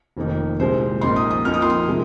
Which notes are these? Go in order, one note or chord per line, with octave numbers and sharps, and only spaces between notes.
F1 F2 D#3 A#3 D#4
C2 A#2 G#3 C5
A#1 A#2 A#3 D#4 C6
D#6
D#6
F2 F3 A#3 D#4 F6
D#6
C6
D#6
C3 G#3